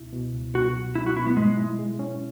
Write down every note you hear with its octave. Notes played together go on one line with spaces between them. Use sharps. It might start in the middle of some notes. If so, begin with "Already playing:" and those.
Already playing: C#2 B2 E4
B2
C#2
B2 F#4
F#3
F#3 E4
F#4
B2 E4
B3
G#2 G#3
E4
G#3
C#4